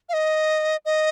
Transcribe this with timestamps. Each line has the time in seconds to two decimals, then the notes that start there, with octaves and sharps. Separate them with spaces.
0.09 F5
0.13 D#5
0.85 D#5